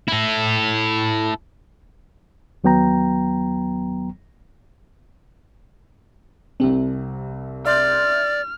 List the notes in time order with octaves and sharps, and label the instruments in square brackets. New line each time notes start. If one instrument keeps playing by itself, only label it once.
[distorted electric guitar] E4 A4
[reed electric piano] D#2 F#3 B3 G5 A#5
[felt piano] C2 C3 [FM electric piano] C4 G4
[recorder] D5 [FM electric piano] E5 C6 G6 [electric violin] F6